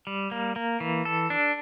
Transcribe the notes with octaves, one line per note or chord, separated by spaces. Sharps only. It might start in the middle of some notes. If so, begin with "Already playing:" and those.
G3
A#3
A#3
E3
A4
D4